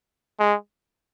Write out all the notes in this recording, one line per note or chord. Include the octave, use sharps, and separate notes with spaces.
G#3